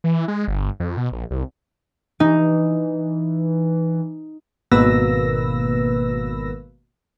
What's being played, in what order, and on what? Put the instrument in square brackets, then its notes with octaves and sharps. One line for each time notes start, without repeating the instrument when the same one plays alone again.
[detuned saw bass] E3
G#3
G1
F2
B2
A#1
C2
[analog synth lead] E3 [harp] D#4
[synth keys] G#1 B2 A#3 B4 E6 A#6